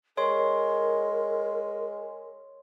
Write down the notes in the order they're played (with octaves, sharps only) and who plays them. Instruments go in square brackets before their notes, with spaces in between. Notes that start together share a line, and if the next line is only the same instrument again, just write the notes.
[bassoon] G#3 [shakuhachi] A#4 [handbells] C#5 C6